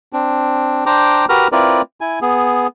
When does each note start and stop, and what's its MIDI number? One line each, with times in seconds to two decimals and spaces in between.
0.13 0.84 60
0.13 0.84 62
0.86 1.25 62
0.86 1.25 72
0.86 1.25 79
0.86 1.25 82
0.86 1.25 86
1.29 1.48 66
1.29 1.48 67
1.29 1.48 70
1.29 1.48 71
1.29 1.48 82
1.29 1.48 89
1.52 1.82 60
1.52 1.82 64
1.52 1.82 65
1.52 1.82 70
1.52 1.82 71
1.52 1.82 74
2.01 2.19 64
2.01 2.19 80
2.22 2.67 59
2.22 2.67 68